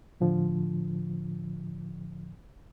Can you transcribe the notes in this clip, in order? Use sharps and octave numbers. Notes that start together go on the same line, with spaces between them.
A2 D3 F3